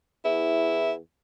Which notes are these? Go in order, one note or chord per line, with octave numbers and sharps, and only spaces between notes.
E2 E4